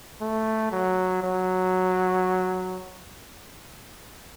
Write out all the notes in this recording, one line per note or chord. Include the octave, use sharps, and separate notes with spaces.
A3
F#3
F#3